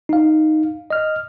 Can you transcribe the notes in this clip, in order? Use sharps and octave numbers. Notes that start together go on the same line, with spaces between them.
D#4 F5
D#5 F6